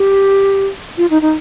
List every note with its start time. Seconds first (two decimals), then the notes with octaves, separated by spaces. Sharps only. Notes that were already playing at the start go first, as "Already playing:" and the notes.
Already playing: G4
0.98 F4
1.10 D#4
1.22 D#4